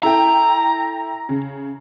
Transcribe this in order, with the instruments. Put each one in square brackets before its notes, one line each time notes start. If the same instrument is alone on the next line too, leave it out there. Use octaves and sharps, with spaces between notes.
[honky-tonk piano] E4 A4 G5 [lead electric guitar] A#5
[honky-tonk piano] C#3